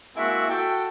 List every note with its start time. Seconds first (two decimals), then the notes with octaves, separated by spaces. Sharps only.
0.16 G#3 A#3 C4 E4 F#4 E5
0.48 F#4 A4 G5